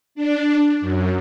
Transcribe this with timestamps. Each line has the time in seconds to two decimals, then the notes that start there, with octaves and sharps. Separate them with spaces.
0.15 D4
0.81 F#2